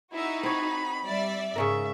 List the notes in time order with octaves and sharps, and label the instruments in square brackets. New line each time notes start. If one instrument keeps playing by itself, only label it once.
[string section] D#4 F#4 [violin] E4 E5
[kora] C4 C#5 [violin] B5
[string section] G3 D5 E5
[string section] G#2 [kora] C#3 C#4 A#4 [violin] E5